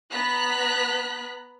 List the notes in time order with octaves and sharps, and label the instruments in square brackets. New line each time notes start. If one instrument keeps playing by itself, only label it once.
[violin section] B3 A#5 F#6 B6